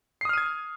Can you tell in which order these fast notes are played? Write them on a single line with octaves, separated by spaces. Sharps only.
C7 D#6 F6 D#7 G#6